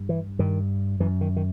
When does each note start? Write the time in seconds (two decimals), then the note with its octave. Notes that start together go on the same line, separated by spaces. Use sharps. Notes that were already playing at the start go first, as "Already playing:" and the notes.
Already playing: G2
0.09 E3
0.39 G2 D#3
1.00 F#2 E3
1.21 D#3
1.36 D#3